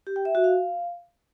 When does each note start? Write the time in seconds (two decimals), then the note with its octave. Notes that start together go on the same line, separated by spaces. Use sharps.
0.07 G4
0.16 G5
0.25 E5
0.35 F#4
0.44 F5